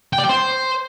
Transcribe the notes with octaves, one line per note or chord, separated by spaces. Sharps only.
G5
D5
G5
C5